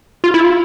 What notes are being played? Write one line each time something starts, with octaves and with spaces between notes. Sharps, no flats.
F4
E4
F4